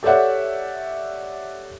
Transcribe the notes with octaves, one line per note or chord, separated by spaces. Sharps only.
G4 A4 C#5 D5 E5 F#5